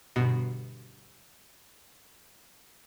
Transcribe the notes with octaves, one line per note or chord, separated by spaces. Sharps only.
G1 B2